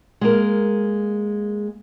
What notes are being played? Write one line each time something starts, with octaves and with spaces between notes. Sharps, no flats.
G#3 A#3 A#4